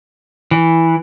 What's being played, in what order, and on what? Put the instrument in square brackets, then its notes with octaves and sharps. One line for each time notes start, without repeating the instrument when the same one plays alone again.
[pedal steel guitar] E3